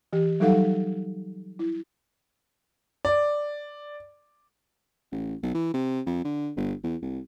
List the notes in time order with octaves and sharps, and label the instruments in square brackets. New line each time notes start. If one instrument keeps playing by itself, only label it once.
[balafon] E3 G4
F#3 G3 D#4 A4 F5 F#5
E4
[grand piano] D5
[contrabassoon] A1
B1
E3
C3
F2
D3
G1
E2
C2